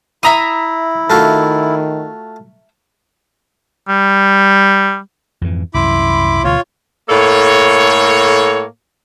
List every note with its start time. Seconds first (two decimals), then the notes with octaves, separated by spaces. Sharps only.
0.23 E4 E5 A#5 C6 D#6
1.10 D#3 A3 F4 F#4
3.89 G3
5.41 F2 G#2 E3
5.74 C2 F#2 E3 E4 B5 C6 D6
6.44 D2 B2 E3 F4 C#5
7.10 A2 A#3 A4 C#5